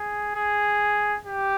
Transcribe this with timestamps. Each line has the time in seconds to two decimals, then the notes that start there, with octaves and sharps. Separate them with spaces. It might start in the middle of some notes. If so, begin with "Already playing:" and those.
Already playing: G#4
0.35 G#4
1.26 G4